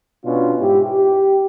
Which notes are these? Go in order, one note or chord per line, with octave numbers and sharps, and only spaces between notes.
B2 C#4 D4 F4
G#2 E4 G4
G4